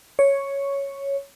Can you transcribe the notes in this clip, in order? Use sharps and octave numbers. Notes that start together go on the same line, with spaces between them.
C#5